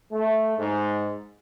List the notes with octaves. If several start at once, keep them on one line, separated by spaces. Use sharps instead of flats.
A3
G#2